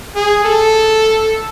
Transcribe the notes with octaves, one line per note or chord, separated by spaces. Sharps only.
G#4
A4